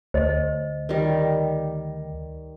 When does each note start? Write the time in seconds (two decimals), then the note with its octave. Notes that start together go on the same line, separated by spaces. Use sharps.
0.14 D2 C5 D#5
0.89 D#3 G3